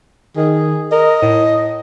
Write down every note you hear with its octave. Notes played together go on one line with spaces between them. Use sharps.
D#3 G#4
A#4 D#5
A2